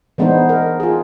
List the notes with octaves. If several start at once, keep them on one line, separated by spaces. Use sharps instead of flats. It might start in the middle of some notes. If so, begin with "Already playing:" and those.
E3 G#3 B3 D4 D#4 C5
A#4
F4 G#4